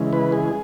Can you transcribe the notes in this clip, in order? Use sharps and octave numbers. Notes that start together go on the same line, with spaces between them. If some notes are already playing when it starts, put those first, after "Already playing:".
Already playing: C#3 E3 G#3
B4
G#4